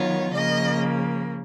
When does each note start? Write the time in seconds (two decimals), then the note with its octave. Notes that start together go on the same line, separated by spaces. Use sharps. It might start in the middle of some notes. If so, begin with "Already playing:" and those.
Already playing: D#3 F#3 B3 F4 C#5
0.33 C#3 F3 A#3 D#5